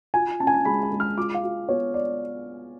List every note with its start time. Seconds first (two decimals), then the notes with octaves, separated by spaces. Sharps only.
0.14 F4 G#5
0.40 C#4 A5
0.47 G#5
0.54 A5
0.65 G#3 B5
0.83 B5
0.92 G#3
1.00 F6
1.18 F4 D6
1.34 F5
1.44 F4
1.69 B3 C#5
1.94 D5